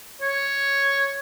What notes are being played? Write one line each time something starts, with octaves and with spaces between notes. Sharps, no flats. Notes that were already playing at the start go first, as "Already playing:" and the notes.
C#5